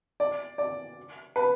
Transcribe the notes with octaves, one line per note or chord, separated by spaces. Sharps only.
D5
D5
B4